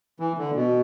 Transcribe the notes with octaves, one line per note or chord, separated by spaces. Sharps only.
E3
D3
B2